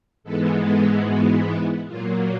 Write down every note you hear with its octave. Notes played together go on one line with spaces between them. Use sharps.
G#2 E3 G#3 B3 A4
A4
F#4
E4
A#2 F#3 A#3 F4